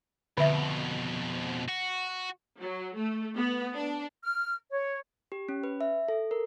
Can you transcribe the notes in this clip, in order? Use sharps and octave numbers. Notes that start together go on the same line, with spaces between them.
F2 B2 D3 E5
F#4
F#3
A3
B3
D4
F6
C#5
G4
C#4
B4
E5
A4
A#4